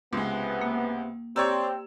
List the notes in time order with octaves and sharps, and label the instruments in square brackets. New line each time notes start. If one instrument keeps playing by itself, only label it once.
[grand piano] C#2 G#3 [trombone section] C3 B3
[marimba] A#3
[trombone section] C4 [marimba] G4 A#5 G6 [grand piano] C#5 D5 E6